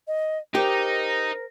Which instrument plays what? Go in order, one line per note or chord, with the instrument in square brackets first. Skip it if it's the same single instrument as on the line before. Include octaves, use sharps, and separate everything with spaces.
[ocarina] D#5
[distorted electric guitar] D#4 [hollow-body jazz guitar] G4 [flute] A#4 [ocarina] C5